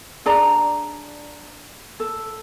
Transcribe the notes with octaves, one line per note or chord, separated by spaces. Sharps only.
D4 G#4 D5 A#5
A4